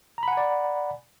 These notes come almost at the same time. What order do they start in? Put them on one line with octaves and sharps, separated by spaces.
A#5 B5 F#5 G#5 D5